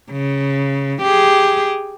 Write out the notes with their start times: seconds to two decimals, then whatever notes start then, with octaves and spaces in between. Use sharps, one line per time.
0.11 C#3
1.03 G4 G#4